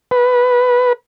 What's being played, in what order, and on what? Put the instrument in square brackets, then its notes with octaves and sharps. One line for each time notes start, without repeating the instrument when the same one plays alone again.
[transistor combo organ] B4